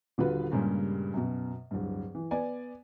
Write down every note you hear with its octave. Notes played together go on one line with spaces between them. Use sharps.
D#1 D3 F4 F#4 B4
G2 A#2 C#3 G3 G#3 A#3
F#2 B2
D1 G2
E3
B3 D5 G#5